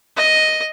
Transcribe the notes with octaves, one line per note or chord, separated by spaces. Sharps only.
D#5